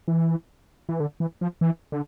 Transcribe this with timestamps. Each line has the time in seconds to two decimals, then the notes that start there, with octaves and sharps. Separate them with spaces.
0.08 E3
0.89 E3
1.00 D3
1.20 E3
1.41 F3
1.61 E3
1.92 D3